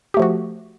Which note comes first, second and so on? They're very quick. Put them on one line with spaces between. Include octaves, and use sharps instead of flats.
G4 A3 F3 F#4